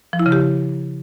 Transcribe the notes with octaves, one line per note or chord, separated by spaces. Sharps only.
F3
E4
C#3
G4